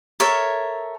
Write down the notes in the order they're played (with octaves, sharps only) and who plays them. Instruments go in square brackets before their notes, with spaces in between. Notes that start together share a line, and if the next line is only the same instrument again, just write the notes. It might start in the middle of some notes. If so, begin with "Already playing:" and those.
[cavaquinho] A4 A#4 C#5 E5